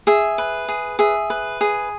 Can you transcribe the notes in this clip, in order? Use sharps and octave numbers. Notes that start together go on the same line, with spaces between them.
G#4 E5
B4
G#4
G#4 E5
B4
G#4